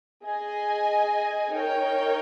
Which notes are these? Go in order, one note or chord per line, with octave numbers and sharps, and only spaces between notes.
G#4 D#5 G#5
D#4 A#4 C#5 G5